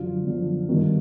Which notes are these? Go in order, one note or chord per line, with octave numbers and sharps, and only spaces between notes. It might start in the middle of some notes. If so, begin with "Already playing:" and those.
Already playing: F#2 D3 F3 F4 F5
F#2 D3 F3
G2 D#3 F#3